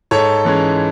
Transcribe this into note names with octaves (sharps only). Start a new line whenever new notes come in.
G#2 A4 C#5
E3 G#3 C#4